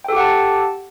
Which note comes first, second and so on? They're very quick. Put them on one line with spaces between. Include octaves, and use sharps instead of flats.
G5 A4 G4 F#5 A5